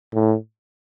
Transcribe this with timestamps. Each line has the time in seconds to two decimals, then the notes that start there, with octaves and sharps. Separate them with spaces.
0.14 A2